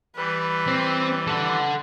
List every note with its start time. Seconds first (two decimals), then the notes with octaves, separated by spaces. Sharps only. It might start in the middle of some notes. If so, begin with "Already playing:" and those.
0.16 E3 G3 B4
0.67 C4
1.27 A4 F#5